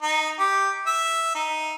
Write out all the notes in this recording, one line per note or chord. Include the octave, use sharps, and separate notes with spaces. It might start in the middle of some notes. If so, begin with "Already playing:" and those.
D#4
G4
E5
D#4